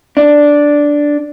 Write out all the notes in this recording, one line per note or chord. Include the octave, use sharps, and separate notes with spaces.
D4